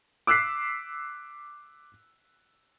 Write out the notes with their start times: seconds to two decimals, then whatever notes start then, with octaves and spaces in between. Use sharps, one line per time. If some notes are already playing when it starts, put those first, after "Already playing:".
0.27 D6 E6 F#6 B6 C7